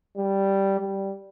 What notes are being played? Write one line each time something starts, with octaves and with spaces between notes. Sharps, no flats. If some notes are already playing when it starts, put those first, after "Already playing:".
G3
G3